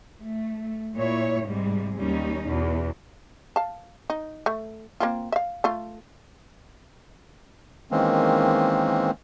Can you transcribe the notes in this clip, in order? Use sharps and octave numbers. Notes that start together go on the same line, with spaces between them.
A3
A#2 E4 C#5
G#2 C3 G3 G#3
D#2 G3 C#4 D#4
E2 B2
F5 A5
D#4
A3
A#3 C4 F4
E5 F5
A3 F4
D#3 E3 G#3 A#3 C4 C#4